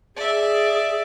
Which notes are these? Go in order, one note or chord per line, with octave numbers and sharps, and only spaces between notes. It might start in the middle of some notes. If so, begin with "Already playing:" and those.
G#4 D5 E5